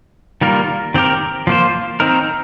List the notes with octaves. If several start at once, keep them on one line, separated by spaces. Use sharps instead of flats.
D#3 G3 A#3 F4 A#4
D#3 C4 G4 A#4
F3 A#3 F4 C5
D#3 C4 D#4 A#4